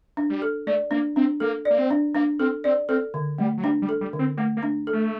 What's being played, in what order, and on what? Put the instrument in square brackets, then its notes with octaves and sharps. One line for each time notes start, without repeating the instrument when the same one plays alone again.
[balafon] D4
[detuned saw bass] G3
[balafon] A4
[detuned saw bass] A3 [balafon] D5
[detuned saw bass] A#3 [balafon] D4
[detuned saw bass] C4 [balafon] D4
[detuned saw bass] A#3 [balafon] A4
[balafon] D5
[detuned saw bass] A#3
C4
[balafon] D4
[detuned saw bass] A#3 [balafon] D4
[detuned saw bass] C4 [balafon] A4
[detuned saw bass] C4 [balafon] D5
[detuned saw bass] C4 [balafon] A4
[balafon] D3
[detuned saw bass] G3 [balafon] A3
[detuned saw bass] F#3
[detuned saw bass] G3 [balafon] D4
[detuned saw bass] G3
[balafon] A4
[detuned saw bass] G3
[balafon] D3
[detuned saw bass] C4
[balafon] A3 [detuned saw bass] A#3
[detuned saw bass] A#3
[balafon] D4
A4
[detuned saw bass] A3